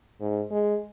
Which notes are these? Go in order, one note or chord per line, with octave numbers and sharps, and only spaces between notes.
G#2
G#3